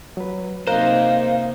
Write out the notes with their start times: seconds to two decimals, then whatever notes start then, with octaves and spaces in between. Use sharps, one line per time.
0.17 F#3 B4
0.67 C3 A#3 D#4 A#4 C5 D#5 F5 F#6